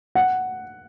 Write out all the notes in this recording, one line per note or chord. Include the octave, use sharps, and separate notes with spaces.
F#5